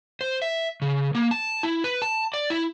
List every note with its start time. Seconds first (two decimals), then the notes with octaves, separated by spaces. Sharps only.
0.21 C5
0.42 E5
0.82 C#3
1.15 A#3
1.31 A5
1.63 E4
1.84 B4
2.02 A5
2.34 D5
2.50 E4